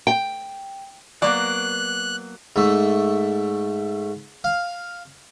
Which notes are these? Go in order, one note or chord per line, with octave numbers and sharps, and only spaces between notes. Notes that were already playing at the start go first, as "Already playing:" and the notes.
G5
F#3 A#3 B3 D5 F#6
G#2 A3
F5